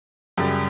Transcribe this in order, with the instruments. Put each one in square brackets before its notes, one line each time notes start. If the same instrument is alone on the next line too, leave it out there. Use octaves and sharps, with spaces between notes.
[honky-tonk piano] F#2 C#3 G3